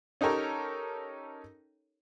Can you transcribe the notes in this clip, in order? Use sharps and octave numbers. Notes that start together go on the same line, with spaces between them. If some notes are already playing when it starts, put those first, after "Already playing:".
C#4 D#4 G4 A4 A#4 C#5